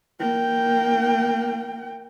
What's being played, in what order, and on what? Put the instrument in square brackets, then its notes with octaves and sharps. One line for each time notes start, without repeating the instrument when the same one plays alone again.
[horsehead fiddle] A#3 G5